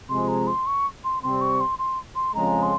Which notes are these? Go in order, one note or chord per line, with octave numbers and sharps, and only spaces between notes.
C3 F3 G#3 C6
A#5
C6
C#6
C6
C3 G3 C4 C6
C#6
C6
C6
C6
F2 C#3 F3 G#3 A#5
C6